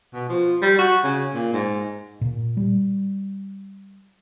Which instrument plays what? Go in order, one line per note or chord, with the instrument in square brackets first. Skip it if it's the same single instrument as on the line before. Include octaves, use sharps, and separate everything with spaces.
[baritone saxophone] B2
F3
G3
F#4
C#3
A#2
G#2
[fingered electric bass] A#2
G3